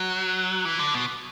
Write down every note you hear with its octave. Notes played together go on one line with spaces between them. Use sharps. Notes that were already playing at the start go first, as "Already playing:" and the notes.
Already playing: F#3
E3
D3
B2